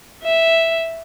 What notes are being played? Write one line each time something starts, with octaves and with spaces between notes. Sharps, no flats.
E5